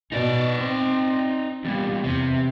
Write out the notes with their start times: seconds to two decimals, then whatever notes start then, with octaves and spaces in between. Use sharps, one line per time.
0.12 B2 D#4 D5
0.60 C4
1.65 E2 A#2 G3
2.04 E2 C3